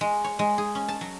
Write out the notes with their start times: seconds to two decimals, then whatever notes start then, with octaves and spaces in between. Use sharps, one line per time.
0.01 G#3
0.24 C#5
0.39 G#3
0.58 G#4
0.75 C#4
0.88 A5
1.01 F#3